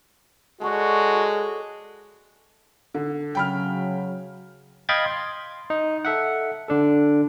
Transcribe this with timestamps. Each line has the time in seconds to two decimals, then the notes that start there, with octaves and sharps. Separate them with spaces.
0.61 G#3 F#4 A4 C#5 D5
2.95 D3
3.35 C#3 F#3 G5 B5 F6
4.89 D#5 F5 G5 B5 G#6 A6
5.05 C6
5.70 D#4
6.05 A4 E5 F#5
6.68 D3 D4 A4